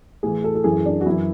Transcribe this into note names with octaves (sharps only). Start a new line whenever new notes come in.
A2 E3 G#4
A4
A4
F#2 E3 G#4
D4
F#4
F#2 E3 E4